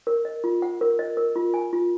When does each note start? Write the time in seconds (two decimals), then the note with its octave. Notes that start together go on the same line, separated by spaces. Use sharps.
0.07 A#4
0.25 D#5
0.44 F4
0.62 F#5
0.81 A#4
0.99 D#5
1.17 A#4
1.36 F4
1.54 G#5
1.73 F4